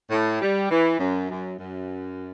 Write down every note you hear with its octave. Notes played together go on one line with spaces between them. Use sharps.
A2
G3
E3
F#2
F#2
F#2